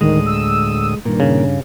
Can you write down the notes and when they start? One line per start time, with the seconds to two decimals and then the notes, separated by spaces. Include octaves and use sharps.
0.01 D2 A2 D#3 G#3 D#6
0.26 E6
1.05 G2 A#2 D#3 A#4
1.20 C#3